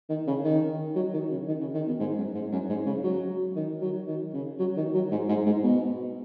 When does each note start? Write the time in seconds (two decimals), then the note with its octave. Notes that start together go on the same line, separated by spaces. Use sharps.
0.09 D#3
0.27 C#3
0.44 D#3
0.96 F#3
1.14 D#3
1.31 C#3
1.48 D#3
1.61 C#3
1.74 D#3
1.87 B2
2.00 G#2
2.17 F#2
2.35 G#2
2.52 F#2
2.69 G#2
2.86 C#3
3.04 F#3
3.56 D#3
3.82 F#3
4.08 D#3
4.33 C#3
4.59 F#3
4.77 D#3
4.94 F#3
5.11 G#2
5.29 G#2
5.46 G#2
5.63 B2